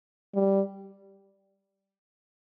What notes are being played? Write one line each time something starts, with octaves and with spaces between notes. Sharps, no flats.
G3